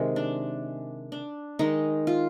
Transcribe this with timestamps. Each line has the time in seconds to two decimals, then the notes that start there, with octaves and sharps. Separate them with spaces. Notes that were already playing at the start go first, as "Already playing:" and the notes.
Already playing: C3 D#3 G#3
0.16 D4
1.12 D4
1.59 D#3 G#3 D#4
2.07 F4